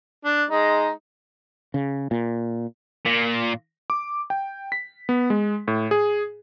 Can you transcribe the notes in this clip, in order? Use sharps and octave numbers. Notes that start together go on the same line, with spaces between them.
D4
G#3 D#4
C#3
A#2
A#2
D6
G5
B6
B3
G#3
A2
G#4